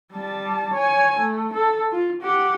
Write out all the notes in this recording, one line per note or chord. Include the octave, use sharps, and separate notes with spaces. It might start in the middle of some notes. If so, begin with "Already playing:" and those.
G3 A5
C#5 G#5
A3
A4
F4
G4 F#5